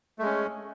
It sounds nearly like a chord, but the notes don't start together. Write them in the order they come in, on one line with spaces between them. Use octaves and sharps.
A3 G#3 C#4